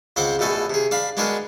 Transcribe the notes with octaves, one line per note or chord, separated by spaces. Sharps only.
C#2 C4 C5 F#5 D6
A#1 B2 A3 A4 G#5
C3 G#4
D4 F5 B5
G#3 B3 D4 F#4 G#4 A#4